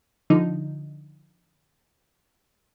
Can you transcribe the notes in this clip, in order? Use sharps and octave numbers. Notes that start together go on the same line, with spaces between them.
D3 F3 D#4